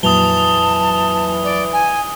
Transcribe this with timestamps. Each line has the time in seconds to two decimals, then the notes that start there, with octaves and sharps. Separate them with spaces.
0.03 F2 A#2 E3 F#3 A5 D#6 F7 G7
1.44 D5
1.73 G#5